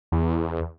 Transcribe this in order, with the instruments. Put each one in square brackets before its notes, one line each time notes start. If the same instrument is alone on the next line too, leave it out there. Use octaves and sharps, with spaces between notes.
[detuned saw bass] E2